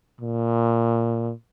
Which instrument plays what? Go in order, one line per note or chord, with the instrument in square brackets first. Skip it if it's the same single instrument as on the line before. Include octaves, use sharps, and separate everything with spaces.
[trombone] A#2